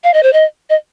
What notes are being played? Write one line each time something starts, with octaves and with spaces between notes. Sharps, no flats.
F5
D#5
C5
D#5
D#5